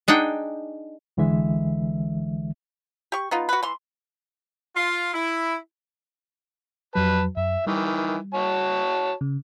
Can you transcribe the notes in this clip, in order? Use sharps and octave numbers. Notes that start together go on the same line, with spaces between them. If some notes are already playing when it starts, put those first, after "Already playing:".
D4 D#4 G#4 F#5 G5
C2 D3 E3 G#3 E5
G4 C#6
B3 D#4 F4
F#4 B4
E3 C6
F4
E4
F2 F#3 B4 A5
F#2 E5
D#3 E3 G3
F#4 C#5 A5
C#3